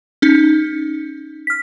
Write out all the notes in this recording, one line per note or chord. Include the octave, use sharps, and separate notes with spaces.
C#4 D#4
F6 B6